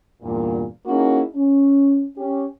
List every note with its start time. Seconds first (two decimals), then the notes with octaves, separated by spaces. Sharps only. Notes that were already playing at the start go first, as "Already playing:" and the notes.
0.21 E2 G2 A#2
0.86 A#3 C#4 D#4 E4 F#4 G#4
1.35 C#4
2.17 C#4 G4